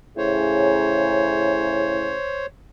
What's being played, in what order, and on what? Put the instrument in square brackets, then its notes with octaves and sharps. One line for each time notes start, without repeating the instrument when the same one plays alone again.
[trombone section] A2 C#3 [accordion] C5 C#5